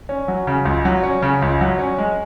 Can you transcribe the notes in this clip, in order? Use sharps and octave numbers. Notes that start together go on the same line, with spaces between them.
C#4
F#3
C#3
C#2
F#3
C#4
C#3
C#2
F#3
C#4
G#3